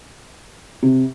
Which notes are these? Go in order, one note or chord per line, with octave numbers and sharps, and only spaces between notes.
C3